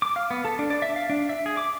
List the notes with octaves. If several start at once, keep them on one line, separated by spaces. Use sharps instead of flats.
D6
F5
B3
A4
D4
D5
E5
F5
D4
E5
G#4
D6